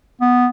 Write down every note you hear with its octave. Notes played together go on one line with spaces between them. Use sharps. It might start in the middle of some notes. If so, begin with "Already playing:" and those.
B3